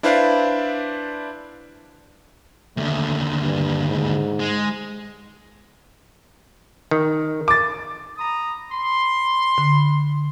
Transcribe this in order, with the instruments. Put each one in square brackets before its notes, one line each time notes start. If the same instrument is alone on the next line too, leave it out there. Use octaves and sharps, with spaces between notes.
[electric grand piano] D4 E4 B4 C5 D5 F5
[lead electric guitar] D#2 D3 [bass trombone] A3
[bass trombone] G2
G#2
[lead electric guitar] G#3
[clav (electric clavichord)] D#3
[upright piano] D6 A6
[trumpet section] A#5 B5 D#6
B5 C6
[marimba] D3